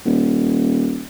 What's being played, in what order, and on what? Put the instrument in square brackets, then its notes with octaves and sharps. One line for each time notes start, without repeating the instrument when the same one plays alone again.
[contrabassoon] D#1